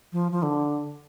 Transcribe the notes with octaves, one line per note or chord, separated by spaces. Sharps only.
F3
F3
D3